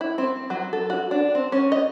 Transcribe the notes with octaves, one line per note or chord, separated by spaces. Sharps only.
E4
C4
F#3
A4
F#4
D4
C4
C#4
D#5